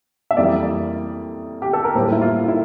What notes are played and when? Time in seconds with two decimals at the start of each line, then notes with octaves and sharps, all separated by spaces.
0.31 E5
0.37 F2 E3 G3 A#3 D5
1.62 G4
1.73 A4
1.84 A#4
1.95 A2 G3 A#3 C5
2.12 E4
2.22 F4
2.48 E4